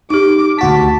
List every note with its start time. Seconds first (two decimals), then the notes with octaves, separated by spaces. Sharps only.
0.10 D#4 G4 D6
0.59 D2 F#4 A5 B6